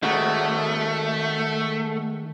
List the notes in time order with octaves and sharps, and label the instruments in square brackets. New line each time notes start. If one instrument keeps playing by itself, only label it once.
[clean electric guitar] D#3 G#3 F#4 [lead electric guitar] A3